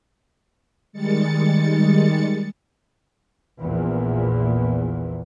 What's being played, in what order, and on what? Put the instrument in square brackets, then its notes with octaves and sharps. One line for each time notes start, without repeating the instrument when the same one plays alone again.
[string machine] D#3 G3 G#3 A6 C#7
[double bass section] A#1 E2 A#2